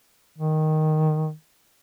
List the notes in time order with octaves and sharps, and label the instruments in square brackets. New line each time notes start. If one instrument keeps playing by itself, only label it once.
[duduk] D#3